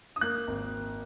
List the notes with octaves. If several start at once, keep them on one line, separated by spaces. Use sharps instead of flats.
D#6
A#3 F#6
G#1